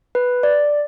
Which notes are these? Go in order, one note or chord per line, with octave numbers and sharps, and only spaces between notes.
B4
D5